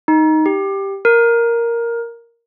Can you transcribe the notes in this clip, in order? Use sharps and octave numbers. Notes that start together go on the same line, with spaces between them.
D#4
G4
A#4